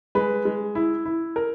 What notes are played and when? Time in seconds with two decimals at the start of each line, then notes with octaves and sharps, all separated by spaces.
0.15 G#3 B4
0.45 G#3
0.75 E4
1.05 E4
1.36 A#4